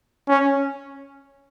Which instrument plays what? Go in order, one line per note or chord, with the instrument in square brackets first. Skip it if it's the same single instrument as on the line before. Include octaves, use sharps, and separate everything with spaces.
[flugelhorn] C#4